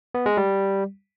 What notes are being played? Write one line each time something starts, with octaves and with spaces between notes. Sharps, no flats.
B3
G#3
G3